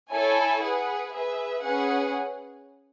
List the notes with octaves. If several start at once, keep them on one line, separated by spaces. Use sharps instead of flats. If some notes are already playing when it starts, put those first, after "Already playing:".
E4 A4 C#5 G#5
G#4 B4 F#5
G#4 B4 E5
C#4 G#4 B4 F#5